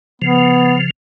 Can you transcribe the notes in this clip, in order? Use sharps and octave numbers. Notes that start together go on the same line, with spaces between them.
C#3 F3 B3